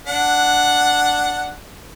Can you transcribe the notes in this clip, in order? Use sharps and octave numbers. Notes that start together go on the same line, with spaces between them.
D4 F#5